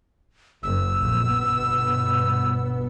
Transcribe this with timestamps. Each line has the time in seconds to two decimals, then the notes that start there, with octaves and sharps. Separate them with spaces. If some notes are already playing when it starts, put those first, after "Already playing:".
0.63 F#1 F#2 E6
0.99 A#1 F2
1.30 G1 B2 B3